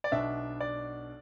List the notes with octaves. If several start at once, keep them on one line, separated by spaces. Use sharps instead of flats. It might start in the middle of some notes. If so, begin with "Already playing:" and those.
D5
B1 B2 B3 D4 E5
D5